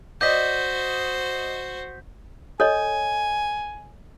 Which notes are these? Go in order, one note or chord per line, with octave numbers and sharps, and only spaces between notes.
F#4 C5 D5 D#5 G6 B6
A4 C#5 D#5 G#5